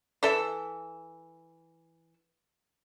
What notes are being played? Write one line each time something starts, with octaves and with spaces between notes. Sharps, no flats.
E3 A4 E5